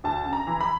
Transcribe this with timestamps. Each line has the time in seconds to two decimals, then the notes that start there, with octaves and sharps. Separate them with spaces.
0.04 D2 A5
0.25 C#3
0.33 A#5
0.47 E3
0.61 B5